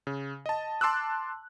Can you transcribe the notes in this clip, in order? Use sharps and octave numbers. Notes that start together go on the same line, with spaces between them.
C#3
D#5 A5
A5 C6 D6 E6 F#6